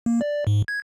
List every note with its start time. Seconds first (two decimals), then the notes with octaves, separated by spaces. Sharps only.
0.06 A#3
0.21 D5
0.47 G#2
0.68 G#6